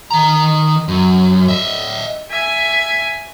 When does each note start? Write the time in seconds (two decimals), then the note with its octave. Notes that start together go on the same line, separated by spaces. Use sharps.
0.11 D#3 A#5
0.88 F#2
1.48 D#5 E5
2.31 E5 G#5